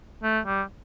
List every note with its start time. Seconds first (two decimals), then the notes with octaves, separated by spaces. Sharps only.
0.23 A3
0.46 G3